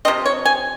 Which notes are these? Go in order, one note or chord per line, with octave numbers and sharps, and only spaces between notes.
C3 F3 C4 D#5
C#5
G#5